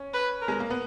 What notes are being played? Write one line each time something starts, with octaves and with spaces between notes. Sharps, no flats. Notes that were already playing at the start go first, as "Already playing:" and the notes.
Already playing: C#4
B4
A#4
G#3
A#3
B3